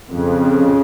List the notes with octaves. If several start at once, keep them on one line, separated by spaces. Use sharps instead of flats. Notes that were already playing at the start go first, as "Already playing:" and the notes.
F2 C#3